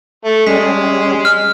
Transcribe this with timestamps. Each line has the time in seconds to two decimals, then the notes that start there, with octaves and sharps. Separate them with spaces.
0.25 A3
0.47 G3 G#3 C#4 B6
1.25 F6